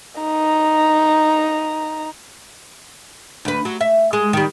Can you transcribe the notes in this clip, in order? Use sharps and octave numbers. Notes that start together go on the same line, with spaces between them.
D#4 A#5
D2 B4
F#3
E5
G#3
D#3 G3